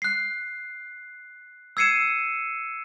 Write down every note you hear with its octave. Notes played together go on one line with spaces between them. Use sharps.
F#6 C7
E6 G#6 C7 C#7 D#7 E7